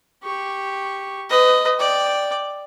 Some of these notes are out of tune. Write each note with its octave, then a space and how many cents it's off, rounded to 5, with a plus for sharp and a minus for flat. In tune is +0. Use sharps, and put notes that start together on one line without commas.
G4 +0 C#6 +0
B4 +30 D#5 +0
D5 +0 G5 +0